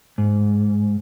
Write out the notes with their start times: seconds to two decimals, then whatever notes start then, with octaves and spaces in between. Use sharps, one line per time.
0.18 G#2